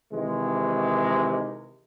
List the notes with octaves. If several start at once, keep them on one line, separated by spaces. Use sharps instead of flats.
C3 D#3 E3 G#3